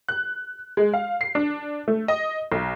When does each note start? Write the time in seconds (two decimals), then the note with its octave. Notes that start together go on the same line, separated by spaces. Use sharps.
0.08 F#6
0.77 G#3
0.94 F5
1.21 C7
1.35 D4
1.88 A3
2.08 D#5
2.52 B1